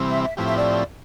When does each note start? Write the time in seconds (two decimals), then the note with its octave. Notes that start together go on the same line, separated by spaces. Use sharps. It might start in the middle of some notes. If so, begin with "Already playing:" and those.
Already playing: C3 E3 G3 C4
0.09 E5
0.23 E5
0.37 A2 F3 C4 E4 G4 E5
0.47 E5
0.56 D5